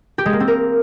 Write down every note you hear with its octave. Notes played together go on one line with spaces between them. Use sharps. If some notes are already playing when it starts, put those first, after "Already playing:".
G4
G#3
A#3
C4
A#4